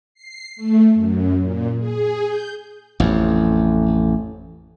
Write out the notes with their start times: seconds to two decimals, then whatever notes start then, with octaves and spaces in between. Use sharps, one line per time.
0.14 C7
0.56 A3
0.94 F#2
1.40 A#2
1.78 G#4
2.26 G6
3.00 A1 F2